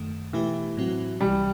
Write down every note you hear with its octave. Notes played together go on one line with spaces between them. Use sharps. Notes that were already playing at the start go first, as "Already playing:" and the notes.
Already playing: F#2 D#3 A3
B2 E3 A3 E4 G4
A2 F#3 C4 F#4
C2 C3 E3 G3